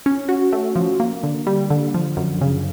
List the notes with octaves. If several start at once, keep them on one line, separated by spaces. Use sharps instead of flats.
C#4
F#4
A3
F3
A#3
D3
G3
D3
F3
F#2
C#3